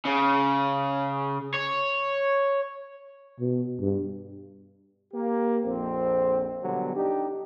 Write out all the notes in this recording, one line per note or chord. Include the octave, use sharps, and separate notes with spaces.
C#3
C#5
B2
G2
A#3 G4
A#1 F2 C4
B2 D3 F#3 G3
D4 D#4 G4